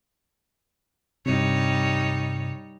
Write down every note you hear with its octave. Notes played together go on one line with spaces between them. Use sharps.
G2 C3 G3 D#4 C#5